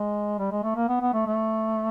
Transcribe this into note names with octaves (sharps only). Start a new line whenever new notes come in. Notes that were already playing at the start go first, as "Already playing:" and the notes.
Already playing: G#3
G3
G#3
A3
A#3
B3
B3
A3
A3